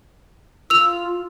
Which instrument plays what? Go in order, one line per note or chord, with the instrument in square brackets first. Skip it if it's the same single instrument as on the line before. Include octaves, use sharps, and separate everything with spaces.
[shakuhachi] F4 [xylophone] E6 F7